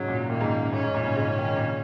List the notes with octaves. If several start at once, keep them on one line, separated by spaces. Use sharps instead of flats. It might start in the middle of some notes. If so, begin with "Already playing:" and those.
Already playing: G#2 C#3 F#3
F#2 A#2
A#2 D#3 A#3
G#2 C#3
F#2
G#2 C#4
G#2
F#2 A#2
G#2 C#3
G#2 C#3
D#3
C#3
A#2
C#3